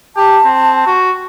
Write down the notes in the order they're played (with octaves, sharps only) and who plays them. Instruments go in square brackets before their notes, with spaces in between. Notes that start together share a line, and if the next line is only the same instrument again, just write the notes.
[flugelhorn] G4 [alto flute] A5
[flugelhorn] C4
F#4